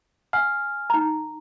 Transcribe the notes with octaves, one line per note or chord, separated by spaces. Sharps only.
F#5 G#5 F6
D#4 A#5